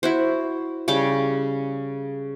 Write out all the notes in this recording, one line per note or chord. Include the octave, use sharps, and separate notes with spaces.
E4 F#4 C5
C#3 G3 G5 D6